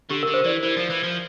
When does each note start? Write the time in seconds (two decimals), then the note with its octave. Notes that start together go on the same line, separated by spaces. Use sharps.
0.10 D3 G4
0.23 A#4
0.28 D3
0.34 C5
0.45 E3 D5
0.63 E3
0.77 F3
0.90 E3
1.04 F3